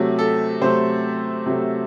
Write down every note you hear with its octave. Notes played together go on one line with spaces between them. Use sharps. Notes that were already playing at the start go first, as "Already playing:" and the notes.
Already playing: C3 F#3 A3
A4
C3 F#3 A3 C5
C3 F#3 A3